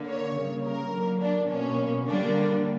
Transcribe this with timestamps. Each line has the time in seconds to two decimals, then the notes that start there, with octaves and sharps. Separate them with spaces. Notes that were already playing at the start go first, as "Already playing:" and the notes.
Already playing: D3 A#3
0.09 C#5
0.37 C#3 G3 A#3
0.66 A#4
0.95 D3 F#3 A#3
1.22 D4
1.50 B2 A#3 C#4
2.08 D3 G3 A#3 D4